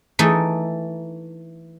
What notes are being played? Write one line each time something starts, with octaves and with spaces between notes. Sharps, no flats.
E3 A3 D#4